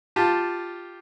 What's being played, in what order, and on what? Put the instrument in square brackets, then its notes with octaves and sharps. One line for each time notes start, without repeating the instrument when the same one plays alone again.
[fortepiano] F4 G4 A5